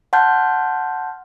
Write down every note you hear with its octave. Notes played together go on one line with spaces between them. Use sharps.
F#5 A5 C6 F6 G6